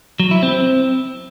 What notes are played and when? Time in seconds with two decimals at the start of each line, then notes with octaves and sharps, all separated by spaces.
0.20 F#3
0.31 E4
0.43 C4